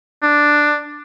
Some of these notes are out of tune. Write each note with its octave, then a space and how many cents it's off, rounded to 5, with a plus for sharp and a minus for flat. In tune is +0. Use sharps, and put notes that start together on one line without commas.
D4 +5